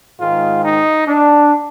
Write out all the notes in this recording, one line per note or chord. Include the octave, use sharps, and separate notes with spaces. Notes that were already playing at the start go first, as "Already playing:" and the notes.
G#2 D#3 G#3 F4
D#4
D4